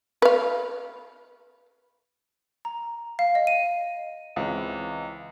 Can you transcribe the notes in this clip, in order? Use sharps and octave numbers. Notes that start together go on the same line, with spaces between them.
B4 F5
A#5
F5
D#5
D#7
C#2 E3 C4